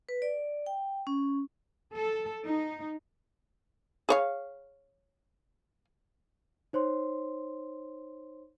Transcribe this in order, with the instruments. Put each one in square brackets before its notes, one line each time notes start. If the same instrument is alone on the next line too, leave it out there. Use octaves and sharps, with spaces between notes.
[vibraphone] B4
D5
G5
C#4
[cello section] A4
D#4
[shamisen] G#4 C#5 F5
[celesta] D#4 C5 C#5 C6